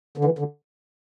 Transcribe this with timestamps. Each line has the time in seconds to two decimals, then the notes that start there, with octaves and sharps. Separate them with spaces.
0.18 D3
0.25 E3
0.39 D3